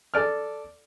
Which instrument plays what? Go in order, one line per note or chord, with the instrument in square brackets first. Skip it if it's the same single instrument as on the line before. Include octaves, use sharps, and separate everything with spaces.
[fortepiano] A4 D5 F6